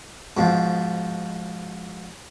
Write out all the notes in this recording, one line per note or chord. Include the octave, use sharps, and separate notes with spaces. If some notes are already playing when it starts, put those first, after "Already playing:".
G#2 B2 F3